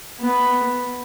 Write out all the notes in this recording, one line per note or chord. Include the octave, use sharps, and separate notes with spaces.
B3